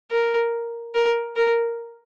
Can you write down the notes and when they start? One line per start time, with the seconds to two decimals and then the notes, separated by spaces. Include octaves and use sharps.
0.11 A#4
0.95 A#4
1.36 A#4